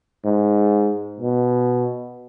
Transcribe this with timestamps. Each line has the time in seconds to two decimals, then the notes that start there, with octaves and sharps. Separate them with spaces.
0.25 G#2
1.20 B2